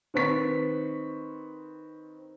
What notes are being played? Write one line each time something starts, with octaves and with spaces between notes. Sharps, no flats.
D#3 C4 B4 C#6 B6